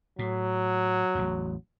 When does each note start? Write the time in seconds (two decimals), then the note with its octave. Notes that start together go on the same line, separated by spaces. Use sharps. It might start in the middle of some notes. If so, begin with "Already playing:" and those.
0.19 A2 F#3
1.15 A1 E2